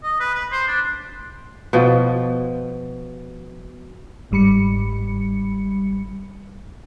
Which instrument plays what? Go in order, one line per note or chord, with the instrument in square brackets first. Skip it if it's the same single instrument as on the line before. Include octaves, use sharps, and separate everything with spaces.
[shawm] D#5
B4
B4
C5
D4
[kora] B2 F3
[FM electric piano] G1 G#2 G3 B5 C#7